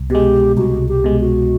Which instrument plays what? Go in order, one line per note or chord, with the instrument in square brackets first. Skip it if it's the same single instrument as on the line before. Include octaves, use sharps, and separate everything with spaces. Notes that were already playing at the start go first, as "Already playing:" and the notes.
Already playing: [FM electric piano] C2
[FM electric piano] B2 G#3 [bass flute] G4
[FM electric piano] C2 [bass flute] F#4
[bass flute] G4
[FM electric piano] B2 G#3
[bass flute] F#4